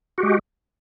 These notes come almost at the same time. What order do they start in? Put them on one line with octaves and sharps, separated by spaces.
F#4 G4 G#3